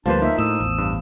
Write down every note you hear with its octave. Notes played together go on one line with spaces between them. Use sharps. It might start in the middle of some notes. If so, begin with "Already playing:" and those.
D2 F3 G3 A#3 D4 B4 C5 A5
A#3 D#4 F4 E5
A2 D#6 E6
A1 E2
G2